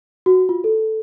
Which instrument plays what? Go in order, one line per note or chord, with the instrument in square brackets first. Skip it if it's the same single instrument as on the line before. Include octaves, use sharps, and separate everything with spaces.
[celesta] F#4
F4
A4